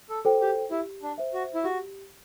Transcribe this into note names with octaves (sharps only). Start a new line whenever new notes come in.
A4
F#4 A4 C5 G5
G4
E4 G4
D4
C5 E5
F#4
E4
F#4 G4